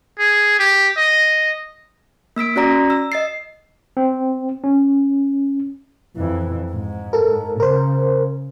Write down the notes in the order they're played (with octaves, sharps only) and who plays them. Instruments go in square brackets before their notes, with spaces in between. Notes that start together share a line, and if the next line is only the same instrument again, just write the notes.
[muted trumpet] G#4
G4
D#5
[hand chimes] A#3 E6 B6 D7
C#4 F#4 D5 A#5 A#6
E6
D#5 A6 C7
[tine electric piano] C4
C#4
[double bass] F2 E3
G#2
[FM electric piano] A4 A#4
[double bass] C#3 [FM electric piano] A#4 C5